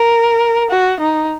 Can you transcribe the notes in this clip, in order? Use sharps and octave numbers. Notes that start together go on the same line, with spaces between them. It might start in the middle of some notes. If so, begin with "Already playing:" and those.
Already playing: A#4
F#4
D#4